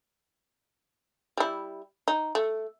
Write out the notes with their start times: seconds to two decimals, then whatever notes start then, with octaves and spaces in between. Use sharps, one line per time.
1.37 G3 E4
2.08 D#4
2.35 A3